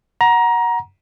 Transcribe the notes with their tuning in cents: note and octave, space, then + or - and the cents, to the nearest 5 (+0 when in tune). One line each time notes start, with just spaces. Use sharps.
F#5 +0 A#5 +20